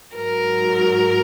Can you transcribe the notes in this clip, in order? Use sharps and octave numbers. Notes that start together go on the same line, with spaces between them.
G#2 F#3 A#4